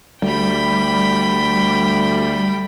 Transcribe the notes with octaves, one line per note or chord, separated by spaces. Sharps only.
D2 G3 G5 B5